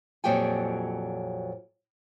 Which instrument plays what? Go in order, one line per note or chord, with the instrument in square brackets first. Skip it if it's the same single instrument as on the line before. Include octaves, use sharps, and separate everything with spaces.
[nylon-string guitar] F2 A#2 F#3 G4 G5 G#5